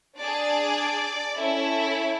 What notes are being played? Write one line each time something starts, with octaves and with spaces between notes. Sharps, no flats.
D4 G#4 D5
C#4 E4 A4